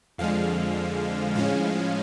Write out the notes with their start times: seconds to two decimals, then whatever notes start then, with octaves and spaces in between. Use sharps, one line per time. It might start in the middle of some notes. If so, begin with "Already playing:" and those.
0.18 F2 D3 F3 G#3 F5
1.35 A2 F3 G#3 C#4 F5